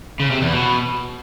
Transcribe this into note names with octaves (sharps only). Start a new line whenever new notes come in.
C#3
C3
E2
B2